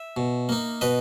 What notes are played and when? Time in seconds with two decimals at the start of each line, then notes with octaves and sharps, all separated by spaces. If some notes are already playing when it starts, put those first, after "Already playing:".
Already playing: E5
0.17 B2
0.49 A#3 D#4
0.81 B2 B4 D#5